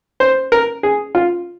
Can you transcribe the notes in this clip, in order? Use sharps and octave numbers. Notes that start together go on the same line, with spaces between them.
C5
A#4
G#4
F4